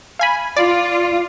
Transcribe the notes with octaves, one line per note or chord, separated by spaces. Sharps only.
F5 G#5 B5
F4 D5